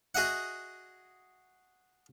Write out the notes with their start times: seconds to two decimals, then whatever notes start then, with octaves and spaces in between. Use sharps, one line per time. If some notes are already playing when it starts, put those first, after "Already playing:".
0.15 F#4 G#4 D#5 E5 F#5